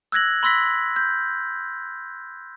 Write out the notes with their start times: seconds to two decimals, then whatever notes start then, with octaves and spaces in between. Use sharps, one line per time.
0.12 E6 F#6 G#6 A#6 F#7
0.43 B5 C6 E6 A#6 B6
0.96 G6